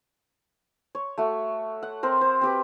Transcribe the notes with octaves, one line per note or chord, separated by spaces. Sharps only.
C#5
A3 F#4
F#5
C4 A#4 C5
C5
C4 G4 B4